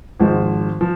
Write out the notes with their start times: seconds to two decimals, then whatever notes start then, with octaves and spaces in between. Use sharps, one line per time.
0.20 G#1 G#2 F3 G#3
0.81 F3